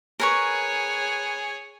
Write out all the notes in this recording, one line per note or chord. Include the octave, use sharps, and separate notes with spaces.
G#4 A#4 B4 C#5 C#6